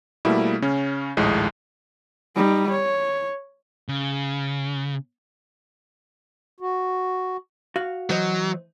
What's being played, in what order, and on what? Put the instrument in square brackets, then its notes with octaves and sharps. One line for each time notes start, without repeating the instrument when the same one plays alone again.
[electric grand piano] B2 G3 A3 A#3 E4
C#3 C#4
A#1 D#2 A2 G#3
[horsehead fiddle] G3 D#4
C#5
[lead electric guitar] C#3
[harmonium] F#4
[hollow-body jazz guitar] F#4 F5
[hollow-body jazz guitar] E3 C5 D#5 [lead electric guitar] F#3